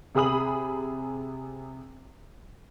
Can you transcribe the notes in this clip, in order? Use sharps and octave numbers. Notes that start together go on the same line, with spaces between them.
C3 G#4 B5 D#6 F#7